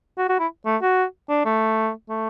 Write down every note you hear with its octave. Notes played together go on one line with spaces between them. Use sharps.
F#4
F#4
E4
A3
F#4
D4
A3
A3